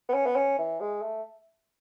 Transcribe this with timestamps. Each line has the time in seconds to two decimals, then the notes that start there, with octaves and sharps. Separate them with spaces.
0.09 B3
0.14 C#4
0.26 B3
0.36 C#4
0.59 E3
0.80 G#3
1.02 A3